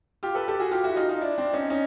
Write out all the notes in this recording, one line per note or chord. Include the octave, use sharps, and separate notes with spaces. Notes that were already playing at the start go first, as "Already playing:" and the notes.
F4 G4
A4 B4
G4 A4
F#4 G#4
F4 G4
E4 F#4
D#4 F4
D#4 F4
D4 E4
C4 D4
C#4 D#4
C#4 D#4